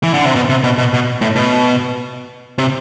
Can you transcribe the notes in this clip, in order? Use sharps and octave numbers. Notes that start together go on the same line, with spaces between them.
E3
D3
C3
B2
C3
B2
B2
B2
A2
B2
C3